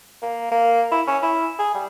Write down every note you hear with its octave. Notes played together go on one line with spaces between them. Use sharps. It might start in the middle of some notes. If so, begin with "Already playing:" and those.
A#3
A#3
E4
C#4
E4
G#4
G3